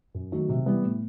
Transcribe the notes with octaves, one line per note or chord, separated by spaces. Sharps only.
F#2
D#3 F#3 A3
C3
E3 G3 B3
A2